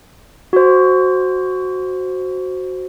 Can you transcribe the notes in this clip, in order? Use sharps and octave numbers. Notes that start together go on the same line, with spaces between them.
F#4 C5